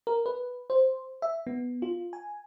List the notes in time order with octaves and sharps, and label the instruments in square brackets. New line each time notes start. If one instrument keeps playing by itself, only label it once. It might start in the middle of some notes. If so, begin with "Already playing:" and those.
[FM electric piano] A#4
B4
C5
E5
B3
F4
G#5